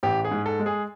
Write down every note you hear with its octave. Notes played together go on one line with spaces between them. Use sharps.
A1 G4
G#4
G#2
A4
G#3
G#4